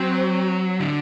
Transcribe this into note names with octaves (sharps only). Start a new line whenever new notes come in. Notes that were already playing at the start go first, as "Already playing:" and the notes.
Already playing: F#3 C4
D3